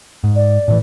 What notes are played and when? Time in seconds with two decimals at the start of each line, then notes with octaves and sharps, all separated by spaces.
0.24 G#2
0.36 D5
0.68 A2 C3 E3